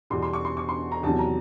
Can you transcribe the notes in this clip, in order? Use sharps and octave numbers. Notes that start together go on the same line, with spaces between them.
E2 B2 G3 C6
C6
C#6
C6
C#6
C6
A#5
E2 C3 D#3 F#3 A5
A#5